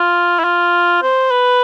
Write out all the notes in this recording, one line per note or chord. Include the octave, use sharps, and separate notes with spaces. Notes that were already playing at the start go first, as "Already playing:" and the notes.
Already playing: F4
E4
F4
C5
B4